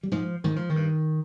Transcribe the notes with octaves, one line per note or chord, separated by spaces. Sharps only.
G3
G#2 F3
G#2 D#3
F3
D#3
G2